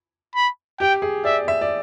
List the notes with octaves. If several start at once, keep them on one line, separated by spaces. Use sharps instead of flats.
B5
G4 G5
G#4
D5 E5
E5
D5